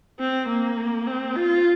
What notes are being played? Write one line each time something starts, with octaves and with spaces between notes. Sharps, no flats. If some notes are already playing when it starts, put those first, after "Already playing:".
C4
A#3
C4
F4